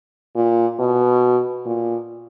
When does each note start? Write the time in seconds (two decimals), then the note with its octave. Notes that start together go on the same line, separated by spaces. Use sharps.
0.36 A#2
0.80 B2
1.66 A#2